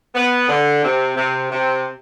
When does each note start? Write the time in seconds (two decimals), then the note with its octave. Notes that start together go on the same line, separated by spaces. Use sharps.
0.15 B3
0.49 D3
0.83 C3
1.17 C3
1.51 C3